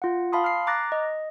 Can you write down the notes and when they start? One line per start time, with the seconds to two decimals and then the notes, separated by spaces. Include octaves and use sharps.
0.02 F4 F#5
0.32 F5 A5 B5 C6 D#6
0.44 F6 C7
0.67 A#5 D6 F#6 A6 A#6
0.92 D#5